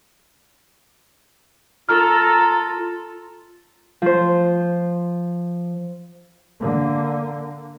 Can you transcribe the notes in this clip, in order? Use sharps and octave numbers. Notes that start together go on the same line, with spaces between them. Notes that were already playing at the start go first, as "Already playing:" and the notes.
F4 A4 A#5 F6
F3 C5
D3 A#3